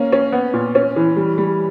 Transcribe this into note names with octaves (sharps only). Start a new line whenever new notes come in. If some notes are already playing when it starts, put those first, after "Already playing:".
Already playing: A#3 C#4
C#4
B3
A#2
C#4
E3
G3
G3